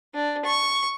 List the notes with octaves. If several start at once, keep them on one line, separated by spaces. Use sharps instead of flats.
D4
C#6